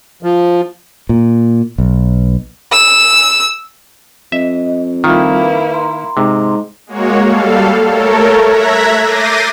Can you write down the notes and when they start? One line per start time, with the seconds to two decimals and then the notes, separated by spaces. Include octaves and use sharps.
0.23 F3
1.09 A#2
1.78 B1
2.72 E6
4.32 F2 D#5 E5
5.04 D#3 G3 A#3 E4 F4
5.41 B4
5.74 A#5 C6
6.17 G#2 C3
6.87 G#3 A#3 F#4 C#5
7.22 G3 A4 F5
7.86 A3 A4 A#4 C#5
8.44 E5 A#5 F#6 G#6 A#6 B6
9.01 D6 G6 A6 A#6 C7 D#7